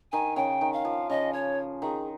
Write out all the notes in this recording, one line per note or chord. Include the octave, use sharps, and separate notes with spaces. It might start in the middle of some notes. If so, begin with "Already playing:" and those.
D#3 G#5
C#3 G5
D#3
F5
F3
C#3 D#5
C#5
D#3 G#4